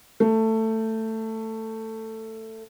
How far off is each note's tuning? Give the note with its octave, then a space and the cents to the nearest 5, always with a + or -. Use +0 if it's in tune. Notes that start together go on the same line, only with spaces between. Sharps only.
A3 +15